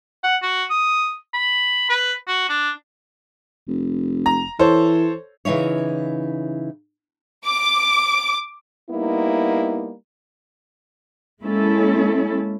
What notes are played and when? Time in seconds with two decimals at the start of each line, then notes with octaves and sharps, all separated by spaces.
0.24 F#5
0.42 F#4
0.70 D#6
1.34 B5
1.90 B4
2.28 F#4
2.49 D4
3.68 F1
4.26 A#5
4.59 E3 A4 C5 C#5
5.45 C#3 E3 D#4 E4 C#5
7.46 D6
8.89 G3 A#3 B3 D#4 E4
11.41 G#3 A#3 C#4 E4 A4